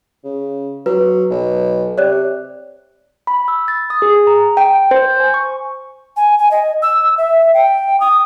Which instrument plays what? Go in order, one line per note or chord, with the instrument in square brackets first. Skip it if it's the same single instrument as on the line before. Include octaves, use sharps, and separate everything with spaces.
[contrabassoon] C#3
[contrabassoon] F#3 [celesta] B4
[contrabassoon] B1
[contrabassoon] C3 [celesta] C#5 D5 F#6
[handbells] B5
E6
A6
D#6
G#4
A#5
G5
C5
G#5
C#6
[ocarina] G#5
G#5
D#5
E6
E5
G5
D#6